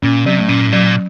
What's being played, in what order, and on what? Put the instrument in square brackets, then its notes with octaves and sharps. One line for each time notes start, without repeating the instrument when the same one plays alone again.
[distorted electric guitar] A#2 [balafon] C#4
[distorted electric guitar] C3 [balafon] F#3
[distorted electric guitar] A2
[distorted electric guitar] A#2 [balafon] C#4
[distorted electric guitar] A2
[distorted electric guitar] A#2 [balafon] F#3